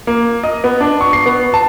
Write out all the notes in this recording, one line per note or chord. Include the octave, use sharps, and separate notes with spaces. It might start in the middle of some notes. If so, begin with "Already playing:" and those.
A#3
D#5
B3
D4
C#6
C7
B3
A5